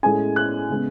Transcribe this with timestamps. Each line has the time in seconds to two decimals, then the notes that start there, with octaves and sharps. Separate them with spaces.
0.03 A2 G#3 C#4 G#5
0.36 F#6
0.70 C#3 G#3 B3